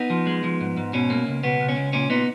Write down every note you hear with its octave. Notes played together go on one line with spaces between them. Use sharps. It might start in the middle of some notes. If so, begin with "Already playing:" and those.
Already playing: B3 D#4
F3
G#3
F3
G#2
G#2
B2 C#4
A#3
C#2
B2 B3
C#2
C#4
C#2
A#2 C#4
A#2 B3 D#4